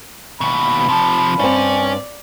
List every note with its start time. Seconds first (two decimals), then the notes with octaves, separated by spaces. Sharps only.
0.41 D#2 B2 B5
0.88 C3 F3 A5
1.39 G2 C4 C#4 D5